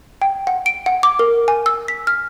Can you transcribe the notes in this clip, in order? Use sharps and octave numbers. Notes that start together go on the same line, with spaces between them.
G5
F#5
D7
F#5
D6
A#4
G#5
E6
B6
F6